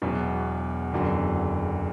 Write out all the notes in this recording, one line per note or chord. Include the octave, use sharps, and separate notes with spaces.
E1 E2 B2 F#3
F#1 E2 D3 F#3